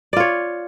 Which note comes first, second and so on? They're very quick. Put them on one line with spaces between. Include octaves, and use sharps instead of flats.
D5 F4 C#5